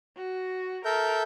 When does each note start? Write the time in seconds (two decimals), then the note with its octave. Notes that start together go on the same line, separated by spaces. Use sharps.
0.17 F#4
0.85 A4 A#4 E5 G6